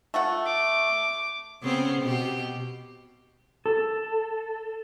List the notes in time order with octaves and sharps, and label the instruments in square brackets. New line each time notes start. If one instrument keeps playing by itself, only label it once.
[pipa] A3 F4 F#5
[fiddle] D6
[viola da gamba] C#3 B3 C4
B2 G4
[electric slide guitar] A4